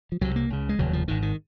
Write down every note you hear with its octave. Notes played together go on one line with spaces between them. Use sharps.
F3
C2 C3 F#3
A#3
C#2 C#3
G#3
F1 D#2 C#3 F#3
F3
G#1 G#2 D#3
D#3